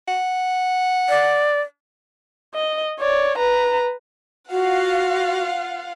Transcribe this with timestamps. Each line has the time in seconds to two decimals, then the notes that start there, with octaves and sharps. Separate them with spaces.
0.08 F#5
1.09 D5
2.54 D#5
3.00 C#5 D5
3.38 B4 A#5
4.51 F4 F#4 F5 F#5